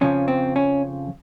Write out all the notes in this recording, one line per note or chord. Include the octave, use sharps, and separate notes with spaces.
F2 C#3 F3 C#4
C4
C#4